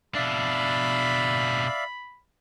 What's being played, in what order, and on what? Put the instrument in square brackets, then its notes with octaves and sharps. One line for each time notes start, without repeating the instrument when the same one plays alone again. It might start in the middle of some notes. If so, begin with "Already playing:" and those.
[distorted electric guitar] B2 D4 [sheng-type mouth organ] D5 E5 F5 [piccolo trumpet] B5